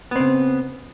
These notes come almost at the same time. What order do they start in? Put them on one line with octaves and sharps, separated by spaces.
B3 C4 C#3